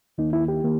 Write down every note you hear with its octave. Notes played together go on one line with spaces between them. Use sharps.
D#2 D#3 A#3 D#4
E4
G4
D#3 A#3